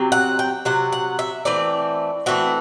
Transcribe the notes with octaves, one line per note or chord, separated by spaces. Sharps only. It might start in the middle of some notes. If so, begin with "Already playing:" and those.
Already playing: C3 F#3 C4
F#5
G5
C3 F#3 F#5
F#5
E5
E3 A3 C4 D5
E3 A3 C4 F#4